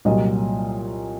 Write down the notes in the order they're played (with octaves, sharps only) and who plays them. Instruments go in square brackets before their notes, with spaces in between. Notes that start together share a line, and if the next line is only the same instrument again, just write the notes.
[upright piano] C2 A#2 F#3 D#5